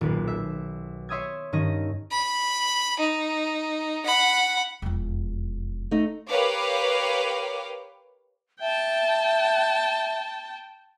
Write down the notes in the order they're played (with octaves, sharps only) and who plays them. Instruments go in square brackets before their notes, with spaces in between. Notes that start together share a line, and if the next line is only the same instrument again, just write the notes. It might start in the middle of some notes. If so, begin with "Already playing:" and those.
[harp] D#1 B1 B4
E5
C#5 E5 C6 D#6 E6 G#6
G2 D#3 C#4 D#5 D#6
[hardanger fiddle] B5
D#4
F#5 B5
[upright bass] E1 F2
[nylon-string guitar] A3 D#4
[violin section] G4 A#4 B4 C#5 F5 D6
[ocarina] E5 [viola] G5 A5